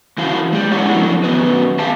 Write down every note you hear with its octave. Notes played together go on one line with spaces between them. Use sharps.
E3 E4 F#4 C5 F5
G#3 G4
G#3 D4 E4 C#5 F#5
F3 F#3 C4 D4 E4
F#2 D#3 B3 F#4 B4
G4 E5 F5 G5 A5